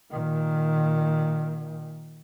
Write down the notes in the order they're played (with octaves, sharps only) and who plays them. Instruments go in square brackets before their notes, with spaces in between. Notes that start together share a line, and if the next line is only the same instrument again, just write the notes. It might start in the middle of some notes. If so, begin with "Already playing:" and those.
[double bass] A#2 D#3